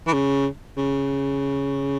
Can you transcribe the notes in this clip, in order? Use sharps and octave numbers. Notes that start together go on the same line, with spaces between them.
E3
C#3
C#3